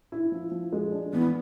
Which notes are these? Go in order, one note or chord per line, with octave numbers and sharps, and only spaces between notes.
E4
F3
F3
G#3
D4
E3 B3